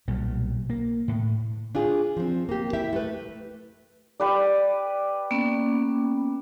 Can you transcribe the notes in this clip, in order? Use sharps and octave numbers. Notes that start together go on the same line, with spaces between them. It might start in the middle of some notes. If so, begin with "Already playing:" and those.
B1 A#2 G3
A#3
A2
D4 F4 G#4
F3 C4
A#3 G4
E4 G4 E5
A3 B4
G4 B4 D5
A#3 B3 C#4